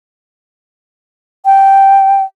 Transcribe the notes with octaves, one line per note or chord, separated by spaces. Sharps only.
G5